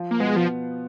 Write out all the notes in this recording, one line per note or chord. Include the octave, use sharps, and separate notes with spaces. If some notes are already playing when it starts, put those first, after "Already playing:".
Already playing: F3 F4
A#3
B2 G#3 B3
F3